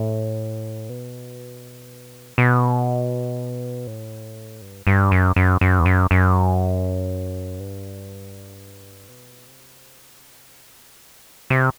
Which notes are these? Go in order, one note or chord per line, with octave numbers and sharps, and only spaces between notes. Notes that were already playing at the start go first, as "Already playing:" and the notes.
Already playing: A2
B2
B2
A2
G2
G2
F#2
F#2
F#2
E2
F#2
F#2
G2
B2
C3
D3
C3